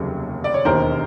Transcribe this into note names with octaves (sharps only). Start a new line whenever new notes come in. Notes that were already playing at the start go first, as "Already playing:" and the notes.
Already playing: F1 D#2 C#3 F#3
D5
C#5
E1 D#2 D#3 A#4 C5